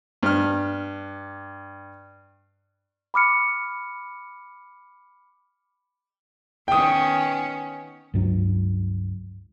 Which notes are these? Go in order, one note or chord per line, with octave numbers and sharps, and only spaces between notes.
G2 F6
B5 D6 F6 C#7
D#3 B3 C#4 G5 D#6
C#2 G2 F#3